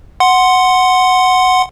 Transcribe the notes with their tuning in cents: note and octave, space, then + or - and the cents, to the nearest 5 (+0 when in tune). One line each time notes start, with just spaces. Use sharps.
F#5 +0 C6 +0